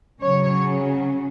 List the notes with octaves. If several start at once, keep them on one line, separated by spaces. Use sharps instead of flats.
C#3 F#3 C#4 C#5